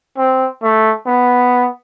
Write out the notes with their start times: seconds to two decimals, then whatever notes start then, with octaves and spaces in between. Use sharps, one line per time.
0.18 C4
0.63 A3
1.06 B3